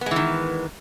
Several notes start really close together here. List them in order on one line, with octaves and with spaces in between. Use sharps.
B3 G#3 E3 D#3